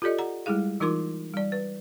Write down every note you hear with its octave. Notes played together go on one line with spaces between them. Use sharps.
F4 G4 A4 D5 D#5
F#5 A#5
G3 G#3 E4 G#4 F5
E3 D#4 F4 A#4 C6 D6
G3 D5
B4